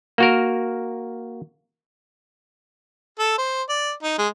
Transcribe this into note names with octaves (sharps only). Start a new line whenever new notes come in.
A#3 F#4 A#4
A4
C5
D5
D#4
G#3